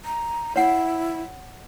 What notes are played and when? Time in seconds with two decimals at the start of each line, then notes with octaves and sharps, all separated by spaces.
0.05 A#5
0.56 E4 C#5 F#5